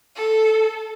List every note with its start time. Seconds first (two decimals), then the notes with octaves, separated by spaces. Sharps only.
0.16 A4